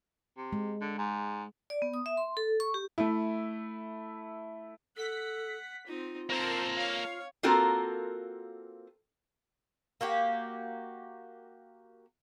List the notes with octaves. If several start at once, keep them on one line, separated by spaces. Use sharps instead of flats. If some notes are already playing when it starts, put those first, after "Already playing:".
C3
G#3
D3
G#2
D5
B3
D#6
E5
C6
A4
C#6
G4
A3 E4
A4 F#5 B6
C4 D#4 F4
A#3 C4 A4 A#4 C5 A5 A#5
C#5 F5
A#3 C4 F4 F#4 A4 A#4
A#3 F#4 G4